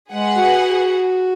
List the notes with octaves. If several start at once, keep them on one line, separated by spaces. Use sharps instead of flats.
G#3 G#4 B4 F#5
F#4